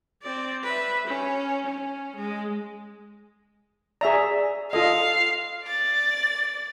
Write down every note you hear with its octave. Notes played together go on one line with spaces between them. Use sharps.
C4 D5
B4 E5
C#4
C#4
G#3
G#4 D5 E5 A#5
F4 A4 D#5 F5
D5 A6